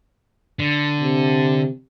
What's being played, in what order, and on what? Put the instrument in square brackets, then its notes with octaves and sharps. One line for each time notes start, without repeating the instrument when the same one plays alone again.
[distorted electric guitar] D3
[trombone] C3